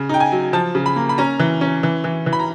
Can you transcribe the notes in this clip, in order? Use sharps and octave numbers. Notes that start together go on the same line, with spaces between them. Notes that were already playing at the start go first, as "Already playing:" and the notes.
Already playing: C#3
D#4 G5
G#5
F#3
F3 A5
C#3
B5
A#3
B5
C#4 A#5
E3
C#4
E3
E3
E3
B5
A#5